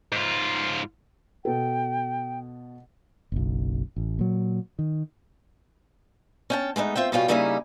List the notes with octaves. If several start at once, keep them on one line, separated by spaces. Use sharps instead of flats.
G#2 F4
B2 A4 G5
F#1 B1
A1
A#2 F#3
D#3
C#4 G5 A5
G#3 A3 B3 D#4
C4 F4 E5 G5
B2 G3 C#4 F4 F5 G5
C#3 G3 A#3 C#4 D#4 E4